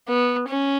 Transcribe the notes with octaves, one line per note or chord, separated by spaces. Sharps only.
B3
C#4